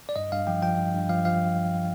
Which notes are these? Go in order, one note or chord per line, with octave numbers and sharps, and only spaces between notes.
D5
G2 D#5
G2 F5
F3 G5
F3 G5
G2
G2
F3 F5
F3 F5